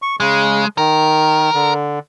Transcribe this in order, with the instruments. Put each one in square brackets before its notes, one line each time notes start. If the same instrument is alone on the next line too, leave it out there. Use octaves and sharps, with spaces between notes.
[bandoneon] C#6
[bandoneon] C#3 [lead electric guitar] G#3
[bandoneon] D#3 [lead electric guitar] A#4
[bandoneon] D3